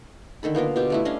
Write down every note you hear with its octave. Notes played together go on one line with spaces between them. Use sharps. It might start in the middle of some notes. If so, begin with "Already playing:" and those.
D3 D#3 A4 B5
A#3 B3 F4 A#4
B2 F4 G4
G3 A3 E4
C#4 D4 D#5 F5